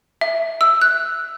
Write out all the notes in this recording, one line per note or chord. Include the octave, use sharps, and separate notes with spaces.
E5
E6
F#6